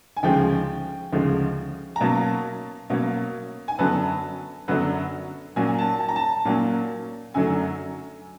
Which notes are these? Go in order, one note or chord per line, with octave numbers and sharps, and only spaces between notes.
G#5
D2 C#3 F3 G#3 G5
D2 C#3 F3 G#3
A#5
B2 F#3 A#3 C#4 A5
B2 F#3 A#3 C#4
G#5
F#2 D3 F#3 B3 A5
F#2 D3 F#3 B3
A#2 F#3 A#3 C#4 G#5
A5
A5
A#5
A5
A#2 F#3 A#3 C#4
F#2 D3 F#3 A3 G#5